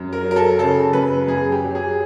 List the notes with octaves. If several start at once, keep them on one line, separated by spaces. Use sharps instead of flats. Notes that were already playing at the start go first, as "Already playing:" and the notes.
Already playing: F#2
A#4
F#3
A#4
A4
C#3 A4
F#2 B4
F#2 G#4
G4
F#3
G#4